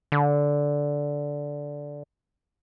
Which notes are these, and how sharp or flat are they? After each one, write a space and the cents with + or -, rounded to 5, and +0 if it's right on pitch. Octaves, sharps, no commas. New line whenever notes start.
D3 -10